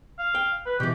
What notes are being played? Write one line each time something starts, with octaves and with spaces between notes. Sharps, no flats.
F5
G5
B4
B2 E3 G4